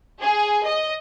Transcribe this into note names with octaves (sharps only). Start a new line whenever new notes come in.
G#4
D#5